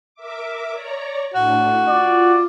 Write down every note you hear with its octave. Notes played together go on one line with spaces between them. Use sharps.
A#4 E5 D6
C#5 D5 A#5
A2 D4 F#4
F4 D5